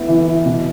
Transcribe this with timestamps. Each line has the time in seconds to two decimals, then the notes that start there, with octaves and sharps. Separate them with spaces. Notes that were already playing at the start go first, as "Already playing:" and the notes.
Already playing: B3 E4
0.08 E3
0.27 E3
0.46 B2